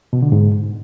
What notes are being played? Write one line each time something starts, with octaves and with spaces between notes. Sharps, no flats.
B2
D3
G#2